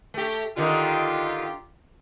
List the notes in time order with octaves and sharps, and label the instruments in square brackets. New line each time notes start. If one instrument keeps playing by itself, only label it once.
[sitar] A3 G4
[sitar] D3 D#3 [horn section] F4 G4